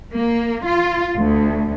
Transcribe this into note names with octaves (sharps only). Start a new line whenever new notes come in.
A#3
F4
D2